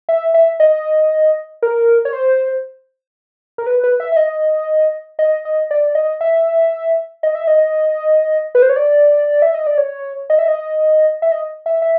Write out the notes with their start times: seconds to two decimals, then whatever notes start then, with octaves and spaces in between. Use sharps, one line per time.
0.09 E5
0.34 E5
0.60 D#5
1.63 A#4
2.05 C#5
2.13 C5
3.58 A#4
3.67 B4
3.84 B4
4.00 E5
4.12 E5
4.16 D#5
5.19 D#5
5.45 D#5
5.71 D5
5.95 D#5
6.21 E5
7.23 D#5
7.35 E5
7.47 D#5
8.55 B4
8.62 C5
8.69 C#5
8.76 D5
9.42 E5
9.54 D#5
9.67 D5
9.78 C#5
10.30 D#5
10.39 E5
10.48 D#5
11.22 E5
11.32 D#5
11.66 E5
11.82 E5